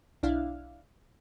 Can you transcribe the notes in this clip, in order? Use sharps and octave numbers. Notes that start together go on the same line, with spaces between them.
B1 D4 E4 F5